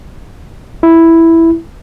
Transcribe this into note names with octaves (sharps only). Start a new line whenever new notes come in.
E4